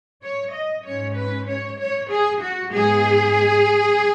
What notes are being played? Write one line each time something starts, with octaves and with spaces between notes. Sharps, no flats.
C#5
D#5
G#2 G#3 C#4 C#5
B4
C#5
C#5
G#4
F#4
G#2 G#3 B3 G#4